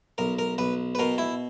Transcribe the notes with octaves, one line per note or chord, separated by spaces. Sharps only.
B1 A#4
A#4
B1 B4
B4
B2 A#4
E4